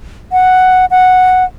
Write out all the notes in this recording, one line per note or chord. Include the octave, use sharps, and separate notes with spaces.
F#5
F#5